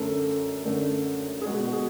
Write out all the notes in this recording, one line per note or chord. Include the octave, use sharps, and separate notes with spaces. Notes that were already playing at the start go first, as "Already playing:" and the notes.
Already playing: F#2 D3 A3 A4
F#2 D3 A3
G#4
B2 G#3 F#4
F#4
G#4